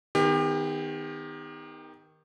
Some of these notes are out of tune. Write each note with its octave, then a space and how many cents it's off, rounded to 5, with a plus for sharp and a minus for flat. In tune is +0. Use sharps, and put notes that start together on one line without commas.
D#3 +5 B3 +30 G4 +35